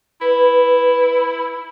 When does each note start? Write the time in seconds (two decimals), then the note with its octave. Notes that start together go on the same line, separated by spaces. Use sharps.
0.21 E4 B4